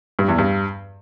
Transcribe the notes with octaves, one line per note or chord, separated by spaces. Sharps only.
G2
E2
G2